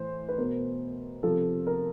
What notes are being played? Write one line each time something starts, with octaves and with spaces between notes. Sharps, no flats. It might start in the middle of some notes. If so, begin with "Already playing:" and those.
Already playing: A2 E3 C5
B4
B2 A#4
C3 F3 A4
A#4